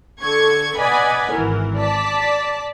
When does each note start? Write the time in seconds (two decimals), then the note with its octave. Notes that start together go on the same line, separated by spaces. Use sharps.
0.22 D3 A4 C#6 G#6
0.78 B4 D5 D#5 F#5 G#5 B5
1.31 G#1 E3 A#4
1.78 D5 A5 B6